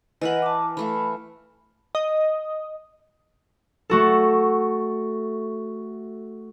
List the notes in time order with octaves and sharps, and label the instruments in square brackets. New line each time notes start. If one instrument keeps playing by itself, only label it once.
[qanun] E3 A#4 B4 [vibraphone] D#5 F#5
[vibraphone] A5 D6
[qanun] E3 A3 F5 [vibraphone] B5
[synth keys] D#5
[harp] A3 F#4 A4